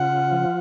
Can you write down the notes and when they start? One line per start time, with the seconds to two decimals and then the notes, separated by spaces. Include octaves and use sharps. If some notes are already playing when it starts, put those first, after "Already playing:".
Already playing: C#3 F4 F#5
0.32 F3